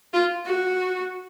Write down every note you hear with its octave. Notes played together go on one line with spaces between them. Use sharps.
F4
F#4